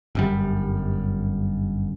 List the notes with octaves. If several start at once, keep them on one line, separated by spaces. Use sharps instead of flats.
G1 F#2 G3